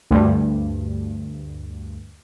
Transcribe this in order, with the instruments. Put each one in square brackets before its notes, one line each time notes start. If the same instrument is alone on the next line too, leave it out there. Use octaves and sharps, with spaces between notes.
[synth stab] D2 G2